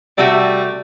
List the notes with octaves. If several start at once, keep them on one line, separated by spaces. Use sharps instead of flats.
C3 G3 A3 F#4